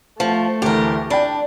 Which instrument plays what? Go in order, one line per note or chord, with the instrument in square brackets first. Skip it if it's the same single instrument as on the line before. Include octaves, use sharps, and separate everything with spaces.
[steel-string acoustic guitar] F3 [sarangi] A3
[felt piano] D2 E3 [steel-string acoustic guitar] G4 A#4
[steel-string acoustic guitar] D4 [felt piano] G5 A5 B5